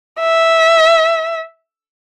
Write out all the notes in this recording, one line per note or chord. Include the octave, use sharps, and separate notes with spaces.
E5